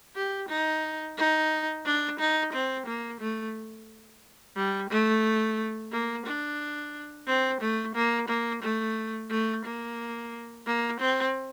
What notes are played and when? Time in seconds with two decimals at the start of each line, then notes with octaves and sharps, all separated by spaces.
0.16 G4
0.49 D#4
1.18 D#4
1.85 D4
2.19 D#4
2.53 C4
2.86 A#3
3.20 A3
4.56 G3
4.90 A3
5.92 A#3
6.26 D4
7.27 C4
7.61 A3
7.95 A#3
8.28 A#3
8.63 A3
9.30 A3
9.65 A#3
10.66 A#3
11.00 C4